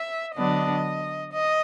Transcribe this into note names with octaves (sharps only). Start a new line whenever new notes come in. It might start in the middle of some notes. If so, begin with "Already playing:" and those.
Already playing: E5
D3 F#3 B3 D4 D#5
D#5